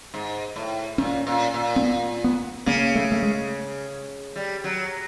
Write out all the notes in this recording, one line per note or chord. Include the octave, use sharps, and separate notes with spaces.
G#2
A2
A#2 C#4
A#2
A#2
C4
B3
B3
C#3 A#3
A3
A3
G#3
G3
F#3